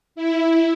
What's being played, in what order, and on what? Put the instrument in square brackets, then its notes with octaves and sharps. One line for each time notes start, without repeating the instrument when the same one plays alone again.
[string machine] E4